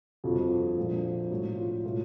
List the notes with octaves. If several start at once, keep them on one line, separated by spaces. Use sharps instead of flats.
G1 F2 D3 F3 F#4
A#1 A#2 F3
B1 A2 F#3 F#4
F4
A2 F#3 F4